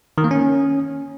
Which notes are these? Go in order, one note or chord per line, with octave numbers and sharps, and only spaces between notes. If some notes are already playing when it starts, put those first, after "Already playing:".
D#3
A#3
C#4